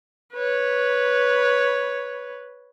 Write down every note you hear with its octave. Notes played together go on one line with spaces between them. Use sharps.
B4 C#5